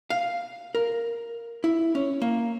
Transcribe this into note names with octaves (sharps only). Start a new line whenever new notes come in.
F5
A#4
E4
C#4
A#3